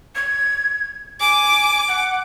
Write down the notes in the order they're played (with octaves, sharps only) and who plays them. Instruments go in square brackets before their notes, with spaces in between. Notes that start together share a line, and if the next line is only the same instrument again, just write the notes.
[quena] G#6
[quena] G#5 [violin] D6
[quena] F#5